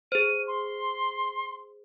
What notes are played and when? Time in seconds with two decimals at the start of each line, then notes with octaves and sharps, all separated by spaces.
0.12 G#4 C5 D#7
0.48 C6